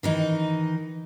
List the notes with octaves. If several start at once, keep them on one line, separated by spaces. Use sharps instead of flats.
D#3 E3 D#4